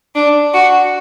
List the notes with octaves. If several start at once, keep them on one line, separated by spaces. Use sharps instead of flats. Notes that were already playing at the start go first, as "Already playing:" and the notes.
D4
F#4